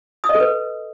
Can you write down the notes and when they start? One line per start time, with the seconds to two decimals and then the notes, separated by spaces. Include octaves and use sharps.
0.24 D#6
0.29 D#5
0.35 A4
0.40 B4